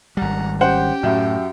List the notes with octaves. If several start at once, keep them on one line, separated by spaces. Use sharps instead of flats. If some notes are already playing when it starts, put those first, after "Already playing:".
G#1 G3 F#5 A#5
C#4 G4 C5 F#5 G5
F#2 A2 F#4 E5 F#5